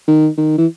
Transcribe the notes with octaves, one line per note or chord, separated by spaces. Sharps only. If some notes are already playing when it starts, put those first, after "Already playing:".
D#3
D#3
E3